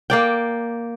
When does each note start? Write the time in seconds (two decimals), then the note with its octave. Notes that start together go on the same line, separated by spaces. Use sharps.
0.10 A#3 D5 G5